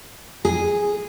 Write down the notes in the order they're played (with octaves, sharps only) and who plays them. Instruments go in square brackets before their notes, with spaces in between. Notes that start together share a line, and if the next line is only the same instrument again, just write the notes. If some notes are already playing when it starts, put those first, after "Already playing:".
[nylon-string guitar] G#4